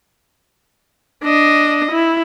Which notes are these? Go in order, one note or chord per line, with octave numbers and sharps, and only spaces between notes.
D4 D#5
E4